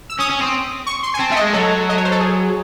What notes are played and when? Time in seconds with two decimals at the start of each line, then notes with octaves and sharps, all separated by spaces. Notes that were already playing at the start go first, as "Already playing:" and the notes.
0.10 E6
0.19 C#4 D#6
0.30 C#4
0.42 C4
0.87 C#6
1.03 C6
1.14 G#5
1.19 C4 A5
1.31 A3 E5
1.36 D#5
1.42 G#3
1.53 F#3 A4
1.89 D#5
1.97 C#5
2.05 C5
2.11 A4
2.19 G#4